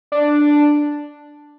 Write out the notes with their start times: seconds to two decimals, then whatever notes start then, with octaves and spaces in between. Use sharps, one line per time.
0.12 D4